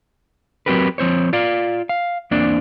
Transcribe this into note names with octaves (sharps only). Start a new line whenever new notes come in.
F#3 C4 F#4 G4 A#4 B4
F3 C4 C5 C#5
F4 D5 F5
F5
E2 A#3 C4 D4 D5